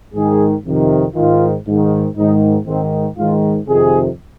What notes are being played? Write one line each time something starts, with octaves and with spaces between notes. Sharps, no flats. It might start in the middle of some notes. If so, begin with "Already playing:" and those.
G#2 D#3 G#4
F2 C3 D#3
G#2 D#3 F4
G#2 D#3
G#2 D#3 D#4
G#2 D#3 C4
G#2 D#3 F4
F2 C3 D#3 G#4